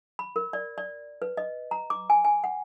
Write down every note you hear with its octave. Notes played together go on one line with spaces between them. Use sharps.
B5
A#4
D5
D5
B4
D#5
A#5
D6
G#5
G#5
F#5